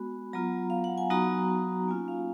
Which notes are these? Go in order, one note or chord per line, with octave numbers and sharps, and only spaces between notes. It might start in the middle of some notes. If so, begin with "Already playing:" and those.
Already playing: G#3 B3 F#4 B5
F#3 B3 F4 A#5
F5
F#5
G#5
F#3 B3 D#4 F#4 A#5
A#3 C#4 F4 G#5
F5